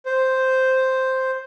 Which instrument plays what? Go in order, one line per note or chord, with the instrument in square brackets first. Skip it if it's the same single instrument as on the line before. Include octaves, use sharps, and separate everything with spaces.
[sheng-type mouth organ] C5